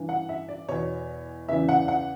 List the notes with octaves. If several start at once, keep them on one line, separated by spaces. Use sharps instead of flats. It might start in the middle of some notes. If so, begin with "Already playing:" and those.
Already playing: G2 E3
F#5
E5
D5
E2 B2 C#5
E2 C#3 E3 E5
F#5
F#5